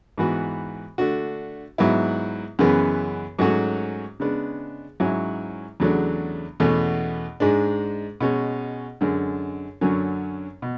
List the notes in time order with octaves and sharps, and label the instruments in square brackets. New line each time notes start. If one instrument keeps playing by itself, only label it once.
[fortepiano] G#2 E3 B3 F#4
D3 A3 D4 F#4
G#2 F#3 B3 E4
F#2 C#3 E3 G#3 B3
G#2 F#3 A3 C#4 F#4
C#3 G#3 B3 D4
G#2 F#3 C#4 E4
E2 C#3 F#3 A3 D4
E2 B2 A3 C#4
G#2 G#3 D4
B2 G#3 C#4
F#2 D3 G#3
F#2 D3 F#3 C#4
B2